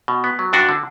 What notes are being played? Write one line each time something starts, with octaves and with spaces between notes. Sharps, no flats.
B2
B3
F#3
G2 D4 F#4
D3